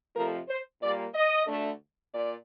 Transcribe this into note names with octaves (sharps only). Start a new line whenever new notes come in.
F2 C3 F3 A3 A#4
C5
A#2 G3 A#3 D5
D#5
D2 D3 A3
A#2 D5